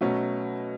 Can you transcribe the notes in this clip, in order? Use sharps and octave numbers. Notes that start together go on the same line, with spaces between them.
B2 F#3 A3 C#4